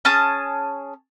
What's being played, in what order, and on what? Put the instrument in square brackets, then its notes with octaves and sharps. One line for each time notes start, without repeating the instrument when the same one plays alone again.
[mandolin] C#4 G#4 A5 D#6